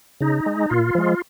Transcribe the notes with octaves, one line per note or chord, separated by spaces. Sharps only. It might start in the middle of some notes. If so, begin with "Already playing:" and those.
C#3 D#4
G#3
A#2 F4
F3 G#3